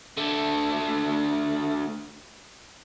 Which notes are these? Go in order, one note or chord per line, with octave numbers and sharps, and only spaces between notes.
D3 A3